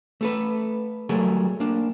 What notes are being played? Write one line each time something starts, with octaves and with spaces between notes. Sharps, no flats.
A3 A4 B4
F#3 G3 A3 G#4 A#4
A#3 D4